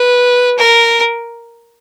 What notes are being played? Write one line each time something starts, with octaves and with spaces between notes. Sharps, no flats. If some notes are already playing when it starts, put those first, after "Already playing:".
Already playing: B4
A#4